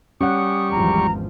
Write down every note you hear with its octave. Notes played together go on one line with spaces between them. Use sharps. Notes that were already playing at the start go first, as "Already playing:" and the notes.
G3 C#4 F#5 C#6 D#6
G#1 E2 F3 A#5